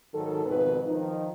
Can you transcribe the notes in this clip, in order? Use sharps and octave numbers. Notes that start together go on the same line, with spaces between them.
G#2 D#3 F#3 A4
F2 G#2 B2 D#3 B4
D#3 F3 D#4